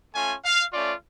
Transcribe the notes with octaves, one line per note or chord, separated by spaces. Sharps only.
A3 C#4 F4 G#5
F5
A3 C#4 F4 D5